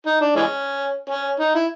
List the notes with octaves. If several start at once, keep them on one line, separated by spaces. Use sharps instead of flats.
D#4
D4
E3 G#3 C#4
C#4
D#4
E4